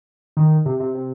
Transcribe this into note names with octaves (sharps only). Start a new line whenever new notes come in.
D#3
C3
C3
C3